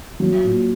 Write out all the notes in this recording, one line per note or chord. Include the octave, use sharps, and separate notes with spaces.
F#3
A#2